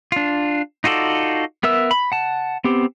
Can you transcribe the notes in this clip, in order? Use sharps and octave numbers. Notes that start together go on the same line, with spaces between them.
D4 F4
D#4 F4 F#4 A4 D5
B3 A#4 E5 E6
B5
F#5 A5
B3 C4 G4